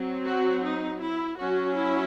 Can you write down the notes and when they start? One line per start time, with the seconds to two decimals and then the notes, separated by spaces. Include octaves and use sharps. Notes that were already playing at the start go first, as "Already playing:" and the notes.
Already playing: F#3 C4
0.26 F#4
0.64 D#4
1.01 E4
1.39 F#3 C#4 F#4
1.76 E4